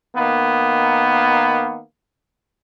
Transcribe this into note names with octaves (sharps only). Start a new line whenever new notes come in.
D#3 A#3 B3